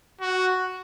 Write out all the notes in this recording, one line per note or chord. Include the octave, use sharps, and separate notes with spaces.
F#4